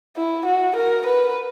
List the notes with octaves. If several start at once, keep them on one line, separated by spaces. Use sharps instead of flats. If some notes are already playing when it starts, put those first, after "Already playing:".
E4
F#4
A#4
B4